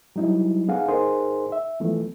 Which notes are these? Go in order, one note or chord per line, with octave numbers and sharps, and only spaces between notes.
F#3 G3 D#4 E4
B3 D#4 G#4 F5 F#5
D#4 G#4 A#4 C5 C6
E5
E3 F3 A3 B3